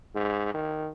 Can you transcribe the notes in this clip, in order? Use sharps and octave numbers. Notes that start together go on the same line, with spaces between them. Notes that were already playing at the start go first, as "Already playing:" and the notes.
G#2
D#3